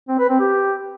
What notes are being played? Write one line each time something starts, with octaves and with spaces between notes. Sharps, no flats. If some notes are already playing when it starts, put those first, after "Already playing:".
C4
B4
C4
G4